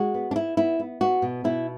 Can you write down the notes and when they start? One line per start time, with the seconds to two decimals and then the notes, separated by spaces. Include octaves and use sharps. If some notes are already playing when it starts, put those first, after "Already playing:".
Already playing: G#3 F#4
0.14 B3
0.31 D4
0.35 B3 E4
0.57 B3 E4
0.79 B3
1.01 B3 F#4
1.22 B2
1.44 B2 E4